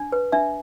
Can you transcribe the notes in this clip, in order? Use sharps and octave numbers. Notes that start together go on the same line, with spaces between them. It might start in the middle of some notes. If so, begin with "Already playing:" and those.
Already playing: D4
B4
D4 E5